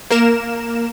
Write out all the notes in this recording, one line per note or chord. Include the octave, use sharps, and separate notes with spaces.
A#3 A#4 E7